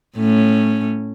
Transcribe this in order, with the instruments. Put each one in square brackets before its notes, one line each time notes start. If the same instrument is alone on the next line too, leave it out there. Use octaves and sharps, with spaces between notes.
[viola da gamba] A2 C#4